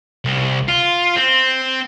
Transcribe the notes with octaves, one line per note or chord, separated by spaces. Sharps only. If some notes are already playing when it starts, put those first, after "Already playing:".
C2
F4
C4